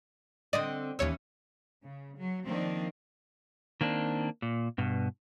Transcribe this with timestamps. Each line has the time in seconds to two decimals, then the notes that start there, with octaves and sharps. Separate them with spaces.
0.53 D3 C4 D5 D#5
0.99 D#2 E3 C#4 C#5 E6
1.83 C#3
2.18 F#3
2.48 D#3 F3 A#3 C4 D4
3.81 D#3 A#3 C4 D4
4.42 A#2
4.78 G2 B2